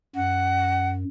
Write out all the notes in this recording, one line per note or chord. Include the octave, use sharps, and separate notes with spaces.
F#2 F#5